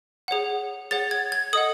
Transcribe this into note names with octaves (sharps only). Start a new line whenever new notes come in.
G#4 C#5 F#5
G#4 C#5 F#5 A6
G#6
G#6
A4 D#5 F#5 D#6